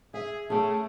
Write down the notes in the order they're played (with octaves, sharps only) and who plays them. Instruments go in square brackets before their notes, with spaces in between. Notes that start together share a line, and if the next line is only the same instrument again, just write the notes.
[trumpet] G#4 [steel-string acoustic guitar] E5
[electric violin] A3 [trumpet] C#4 [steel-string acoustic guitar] G#4 G5 [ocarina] A5